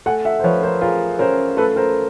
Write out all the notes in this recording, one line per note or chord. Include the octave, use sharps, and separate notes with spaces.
A3 F#5 G#5
E5 F#5
C5
F3 B4 C#5
A#4 C5
F4 G#4 A#4
C#4 A#4 C5
A3 A4 B4
A#4 C5